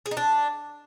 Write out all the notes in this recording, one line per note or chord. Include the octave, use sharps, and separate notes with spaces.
G#4
D#4
D4